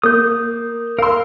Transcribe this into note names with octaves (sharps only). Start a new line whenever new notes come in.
A#3 D#6 G6
A#4 F5 C6 E6